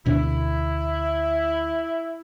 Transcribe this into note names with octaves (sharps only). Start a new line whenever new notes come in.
D2 B2 D4 E4